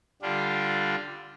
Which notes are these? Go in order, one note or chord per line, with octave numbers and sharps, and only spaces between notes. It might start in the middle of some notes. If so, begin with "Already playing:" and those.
D3 G3 D4 F4